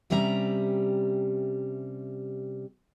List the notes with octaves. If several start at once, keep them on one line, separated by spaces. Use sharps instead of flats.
C3 G3 C#4 E5 A#5